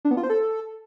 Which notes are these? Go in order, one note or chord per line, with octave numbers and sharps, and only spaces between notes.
D4
B3
F4
C5
A4